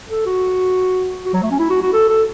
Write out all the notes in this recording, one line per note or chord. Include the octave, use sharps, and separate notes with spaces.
A4
F#4
F#4
F#3
A3
C#4
E4
F#4
F#4
A4
A4